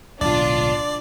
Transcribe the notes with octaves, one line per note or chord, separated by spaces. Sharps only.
D1 B1 D4 F4 D5